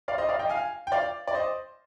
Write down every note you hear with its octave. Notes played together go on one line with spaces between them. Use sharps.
D5 F5
C5 D#5
D5 F5
D#5 G5
F5 G#5
G5
D5 F5
D5
C5 D#5